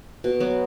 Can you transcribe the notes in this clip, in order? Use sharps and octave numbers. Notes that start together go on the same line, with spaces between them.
B2
F#3 B3 F#4